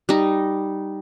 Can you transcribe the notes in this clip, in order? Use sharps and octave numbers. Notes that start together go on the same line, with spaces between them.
G3 D#4